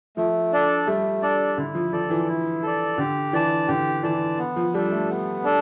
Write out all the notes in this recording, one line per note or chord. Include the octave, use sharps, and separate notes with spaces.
F3 A3
D4 A4 D5
G3 A3
D4 A4 D5
D3 E4
F3
F3 A4 D5
E3
E4
A4 D5
D3 G4
E3 D5 A5
D3 G4
E3 D5 A5
B3
F3
G3 D4 A4
A3
B3
D4 A4